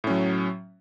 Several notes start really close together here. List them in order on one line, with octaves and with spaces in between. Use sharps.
A2 C#4 F#3